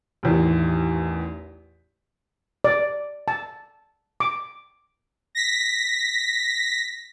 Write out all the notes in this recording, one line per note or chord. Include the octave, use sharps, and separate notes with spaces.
A1 E2 D#3
D5
A5
D6
A#6 B6